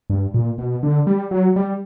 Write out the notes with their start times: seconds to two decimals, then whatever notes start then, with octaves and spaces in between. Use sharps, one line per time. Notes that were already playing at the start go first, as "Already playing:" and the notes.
0.10 G2
0.34 A#2
0.58 B2
0.83 D3
1.07 G3
1.31 F#3
1.56 G3